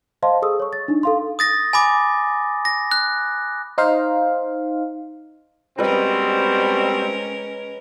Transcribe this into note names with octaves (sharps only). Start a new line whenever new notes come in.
C5 D#5 F5 A5 C6
G#4 A4 D#6 E6
C#5 C#6
A6
D4 D#4
A4 F5 C6
D#6 A6 A#6
G#5 B5 D6
A#6
F#6
D#4 C5 F5
B2 G3 G#3 C4 C#4 A#4 B4 D#5